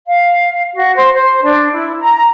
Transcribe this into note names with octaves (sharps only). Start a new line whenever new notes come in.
F5
F#4
C5
C5
D4
E4
A#5